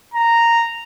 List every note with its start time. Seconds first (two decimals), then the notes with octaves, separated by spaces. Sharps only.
0.14 A#5